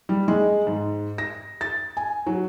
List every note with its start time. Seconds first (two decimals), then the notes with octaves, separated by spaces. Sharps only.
0.09 G3
0.28 G#3
0.67 G#2
1.18 A#6
1.61 A6
1.97 G#5
2.26 F#3